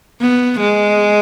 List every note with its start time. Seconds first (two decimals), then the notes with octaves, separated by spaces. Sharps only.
0.21 B3
0.59 G#3